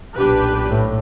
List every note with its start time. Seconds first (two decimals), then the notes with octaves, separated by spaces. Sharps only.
0.15 B1 A#2 D4 G4 B4
0.68 A2